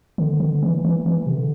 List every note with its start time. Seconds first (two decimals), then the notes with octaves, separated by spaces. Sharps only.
0.18 D3
0.40 D3
0.63 E3
0.85 E3
1.06 E3
1.27 C3
1.36 D3